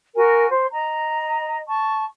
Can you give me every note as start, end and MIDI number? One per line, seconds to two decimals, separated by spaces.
0.15 0.47 66
0.15 0.47 70
0.15 0.47 80
0.50 0.67 72
0.71 1.57 75
0.71 1.57 82
1.68 2.03 81
1.68 2.03 85